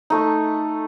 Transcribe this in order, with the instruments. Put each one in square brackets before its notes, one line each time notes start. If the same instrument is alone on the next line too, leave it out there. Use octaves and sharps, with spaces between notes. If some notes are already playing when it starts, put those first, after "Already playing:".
[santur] A3 D#4